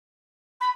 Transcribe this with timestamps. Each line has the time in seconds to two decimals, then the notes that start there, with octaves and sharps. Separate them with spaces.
0.60 B5